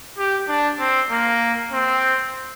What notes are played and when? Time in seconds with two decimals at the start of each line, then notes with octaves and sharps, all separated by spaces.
0.18 G4
0.48 D4
0.79 C4
1.10 A#3
1.72 C4